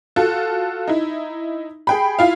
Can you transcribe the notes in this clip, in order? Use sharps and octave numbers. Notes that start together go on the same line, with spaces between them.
F4 F#4 A4
D#4 E4
G#4 G5 B5
E4 F4 F5